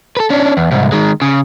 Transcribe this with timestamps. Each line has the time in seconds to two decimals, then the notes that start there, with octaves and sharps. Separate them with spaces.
0.17 A4 B4
0.30 C#4 D4
0.57 E2
0.71 C2 G#2
0.92 D#3 G#3
1.22 C#3